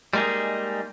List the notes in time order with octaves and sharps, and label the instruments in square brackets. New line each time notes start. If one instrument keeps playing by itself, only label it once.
[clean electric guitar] G3 G#3 A#3 D#4 G#4